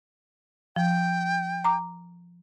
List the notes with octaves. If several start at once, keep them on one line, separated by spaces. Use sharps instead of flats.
F3 G5
A#5 D6